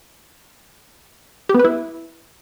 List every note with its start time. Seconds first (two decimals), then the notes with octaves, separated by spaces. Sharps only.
1.49 G4
1.54 B3
1.59 B4
1.64 E4